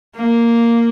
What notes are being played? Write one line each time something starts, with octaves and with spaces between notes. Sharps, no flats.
A#3